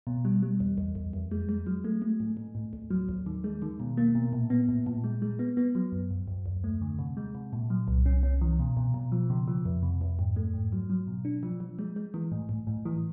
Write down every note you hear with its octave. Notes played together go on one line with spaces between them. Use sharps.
B2
G3
G3
E2
E2
E2
F2
G#3
G#3
F#3
A3
A3
A2
A2
A2
D#2
F#3
D#2
D#3
G#3
D#3
B2
A#3
B2
A#2
B3
A#2
A#2
G#3
G#3
B3
B3
F#3
F#2
F#2
F#2
D#2
A3
D3
C3
G#3
C3
A#2
F#3
C2
C#4
C#4
E3
B2
B2
B2
F3
C#3
F3
F2
C3
F2
G#2
A3
G#2
F#3
F#3
B2
D4
F3
F3
G#3
G#3
E3
A2
A2
A2
E3